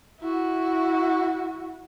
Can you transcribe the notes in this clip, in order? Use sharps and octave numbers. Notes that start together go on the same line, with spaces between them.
E4 F#4